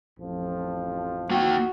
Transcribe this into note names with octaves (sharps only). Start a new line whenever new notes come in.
A1 F2 F3
A#3 F#4 G5